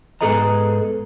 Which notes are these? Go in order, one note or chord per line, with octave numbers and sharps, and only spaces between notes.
G#2 B3 G#4 A4 D#5 A#5